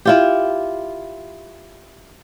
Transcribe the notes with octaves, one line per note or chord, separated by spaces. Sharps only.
E4 F4 G4